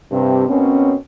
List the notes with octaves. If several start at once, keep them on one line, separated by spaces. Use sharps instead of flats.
G2 C3
B2 A#3 C4 C#4